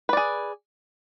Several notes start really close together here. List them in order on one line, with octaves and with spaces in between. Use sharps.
B4 D5 G#4